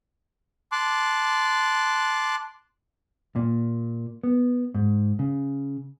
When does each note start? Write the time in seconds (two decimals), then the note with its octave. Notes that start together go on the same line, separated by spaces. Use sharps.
0.72 A5 C6 D6 F#6
3.36 A#2
4.23 B3
4.74 G#2
5.19 C#3